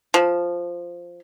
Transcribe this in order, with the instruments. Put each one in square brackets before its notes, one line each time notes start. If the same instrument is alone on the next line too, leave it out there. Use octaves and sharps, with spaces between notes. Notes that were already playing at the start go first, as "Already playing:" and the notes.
[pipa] F3